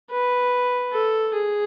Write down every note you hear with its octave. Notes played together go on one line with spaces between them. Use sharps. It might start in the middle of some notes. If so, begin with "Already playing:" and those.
B4
A4
G#4